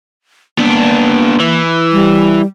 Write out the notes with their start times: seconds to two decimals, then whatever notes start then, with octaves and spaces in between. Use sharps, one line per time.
0.59 A#3 B3 D4
1.40 E3
1.92 G3